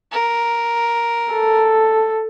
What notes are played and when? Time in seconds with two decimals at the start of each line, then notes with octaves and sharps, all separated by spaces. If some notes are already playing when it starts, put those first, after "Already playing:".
0.11 A#4
1.33 A4